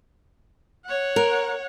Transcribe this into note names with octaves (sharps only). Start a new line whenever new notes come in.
C#5 F#5
A#4